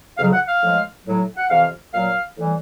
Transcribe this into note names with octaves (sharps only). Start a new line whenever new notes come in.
F2 C#3 F#3 F5
F#5
F5
A2 F3 G#3
A2 F#3
F#5
F2 C3 E3 F5
A#2 F#3 F5
A2 E3 G3